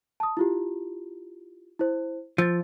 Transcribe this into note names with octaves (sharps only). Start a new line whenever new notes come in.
A5 D#6
E4 F4 G4
E4 C5
F3 E6 A6